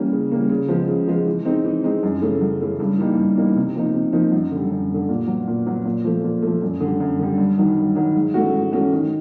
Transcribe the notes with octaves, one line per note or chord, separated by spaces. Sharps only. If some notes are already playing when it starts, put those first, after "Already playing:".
Already playing: E3 G3 A#3 C#4
C#3
E3 G3 A#3 C#4
C#3
F3 G#3 B3
C#3
F3 G#3 B3
E3
G#3 C4 D#4
E3
G#3 C4 D#4
F#2
C#3 E3 A3 C#4
F#2
C#3 E3 A3 C#4
G2
E3 G3 A#3 D#4
G2
E3 G3 A#3 D#4
C3
F3 A#3 D#4
C3
F3 A#3 D#4
F#2
D3 G3
F#2
D3 G3
A#2
F#3 B3
A#2
F#3 B3
A#2
F3 A3
A#2
F3 A3
F#2
D3 G3
F#2
D3 G3
G2
D#3 F#3
G2
D#3 F#3
G#2
E3 A3 C#4 F#4
G#2
E3 A3 C#4 F#4
D#3